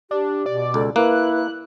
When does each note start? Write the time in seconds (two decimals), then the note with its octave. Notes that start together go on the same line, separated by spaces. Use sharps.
0.11 D4 G4
0.46 B2 D5
0.74 C#2 A4
0.96 A#3 E4 B4 F#6